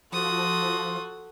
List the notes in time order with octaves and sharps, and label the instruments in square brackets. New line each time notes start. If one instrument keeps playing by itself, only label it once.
[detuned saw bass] F3 [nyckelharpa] F#4 A4 [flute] C6 [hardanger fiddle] D#6